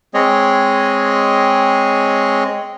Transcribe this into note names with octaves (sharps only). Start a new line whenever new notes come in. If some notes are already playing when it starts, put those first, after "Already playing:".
G#3 C4 G#4 C#5 D#5